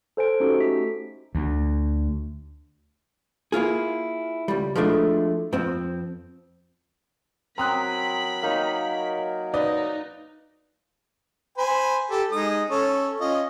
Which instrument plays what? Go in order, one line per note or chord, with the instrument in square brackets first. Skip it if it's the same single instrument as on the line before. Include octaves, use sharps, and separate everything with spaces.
[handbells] A4 C5 G#5 D7
C#4 D#4 F#4 G4 A4
A3 B6
[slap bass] D2
[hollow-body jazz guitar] A#3 E4 F4 G#4
C#2 G3
F3 G#3 A3 D4 E4
F2 F3 C4
[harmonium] F#3 A#4 [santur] C4 [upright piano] A#5 D#6 F#6 [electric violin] B5
[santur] A#3 D#4 C#5
[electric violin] D#4 [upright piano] B4 D5 D#5
[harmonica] C5 G#5 B5
G4 A4
G#3 D#4 D#6
C#4 A4 C#5
C#4 F4 D#5